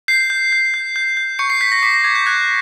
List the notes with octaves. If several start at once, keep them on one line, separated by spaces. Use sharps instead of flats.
G6 C7
G6
G6
G6
G6
G6
C#6 G6 C#7
C7
G6 B6
A#6
D6 B6
A#6
D6 G#6
G6
F#6 G#6